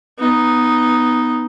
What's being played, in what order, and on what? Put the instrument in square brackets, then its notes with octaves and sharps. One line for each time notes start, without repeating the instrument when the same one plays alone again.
[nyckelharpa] B3 D#4